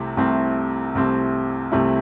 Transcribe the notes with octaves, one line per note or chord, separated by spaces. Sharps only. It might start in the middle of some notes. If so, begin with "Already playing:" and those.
Already playing: C2 C3 A3 C4 E4
C2 C3 A3 C4 E4
C2 C3 A3 C4 E4
C2 C3 A3 C4 E4